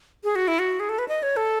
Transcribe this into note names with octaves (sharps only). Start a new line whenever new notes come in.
G#4
F#4
E4
F#4
G#4
A4
B4
D#5
C#5
A4